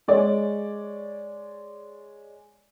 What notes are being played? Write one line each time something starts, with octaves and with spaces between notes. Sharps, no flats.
G#3 C#5 D5